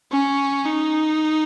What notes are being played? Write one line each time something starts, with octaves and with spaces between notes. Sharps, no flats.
C#4
D#4